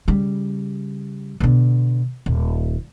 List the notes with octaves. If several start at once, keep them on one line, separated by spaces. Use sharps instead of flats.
C#3 G3
B2 D3
D#1